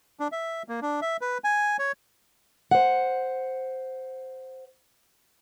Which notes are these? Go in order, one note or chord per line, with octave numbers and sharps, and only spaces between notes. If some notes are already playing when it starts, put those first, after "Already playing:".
D4
E5
A#3
D4
E5
B4
G#5
C#5
C5 F#5